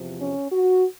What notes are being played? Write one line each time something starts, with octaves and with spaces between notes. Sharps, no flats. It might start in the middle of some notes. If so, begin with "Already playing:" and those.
Already playing: E2 C3 F3
C#4
F#4